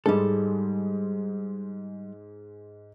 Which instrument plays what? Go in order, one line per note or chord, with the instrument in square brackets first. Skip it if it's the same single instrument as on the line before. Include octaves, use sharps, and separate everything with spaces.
[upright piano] G#2 G#3 [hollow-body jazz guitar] G3 A4